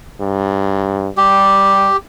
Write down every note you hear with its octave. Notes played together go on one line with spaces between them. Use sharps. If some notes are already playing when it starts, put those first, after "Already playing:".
G2
G3 G4